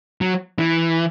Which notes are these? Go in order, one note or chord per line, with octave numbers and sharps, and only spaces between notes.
F#3
E3